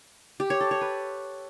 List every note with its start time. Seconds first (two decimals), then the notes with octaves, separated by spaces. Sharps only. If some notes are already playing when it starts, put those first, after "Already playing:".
0.40 G4
0.50 C#5
0.61 A4
0.71 C#5
0.81 B4